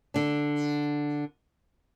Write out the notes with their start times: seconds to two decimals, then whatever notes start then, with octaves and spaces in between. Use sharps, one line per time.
0.14 D3 D4